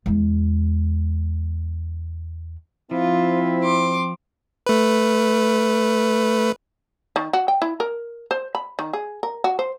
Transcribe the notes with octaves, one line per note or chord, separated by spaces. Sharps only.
E2 G#3
F3 C4 E4 F4
C6 D6
A3 B4
D#3
F#4
G5
E4
A#4
C5
B5
D#3
G#4
A#4
F#4
C5